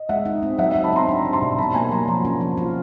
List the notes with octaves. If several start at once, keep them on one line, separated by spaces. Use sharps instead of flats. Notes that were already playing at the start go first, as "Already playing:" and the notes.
Already playing: D#5
G#3 E5 F#5
D#4
C4
F#3 E5 F#5
F#3 E5 F#5
A5 B5
C4 A#5 C6
D4
G3
A#5 C6
B2
F#3 A5 B5
A#3 G#5 A#5
F#3 A#5 C6
F3 A#5 C6
C#4
F3
F4